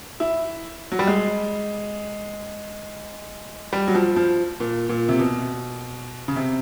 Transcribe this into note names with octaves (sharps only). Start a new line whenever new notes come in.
E4
F#3
G3
G#3
G3
F#3
F3
F3
A#2
A#2
C3
B2
C#3
C3